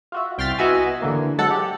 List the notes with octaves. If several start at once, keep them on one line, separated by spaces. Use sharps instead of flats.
F4 F#4 E5
C2 G5 C6 F6 A6 B6
B3 E4 F#4 D#5 E5 G#5
D3 E3 A#3
F#3 G#3 A4 F#5
G4